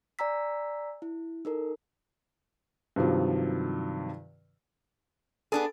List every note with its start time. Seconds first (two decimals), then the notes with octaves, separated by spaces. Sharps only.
0.19 D5 G#5 A#5 E6 B6
1.02 E4
1.45 D#4 A4 A#4
2.96 G2 C3 D#3 F3 F#3
5.52 B3 D4 G#4 A4 A5